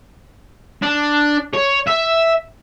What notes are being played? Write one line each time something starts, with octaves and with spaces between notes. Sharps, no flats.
D4
C#5
E5